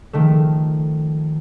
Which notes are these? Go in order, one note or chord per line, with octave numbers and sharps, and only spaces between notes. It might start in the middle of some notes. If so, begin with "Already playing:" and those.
D#3 F3 A3